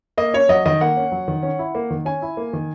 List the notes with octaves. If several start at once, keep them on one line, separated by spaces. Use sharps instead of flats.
A#3 D#5
C#4 C#5
F#3 D#5
D#3 D#5
A#3 F#5
C#4
F#3
D#3
C#4
E4
A#3
D#3
C#4 G#5
E4
A#3
D#3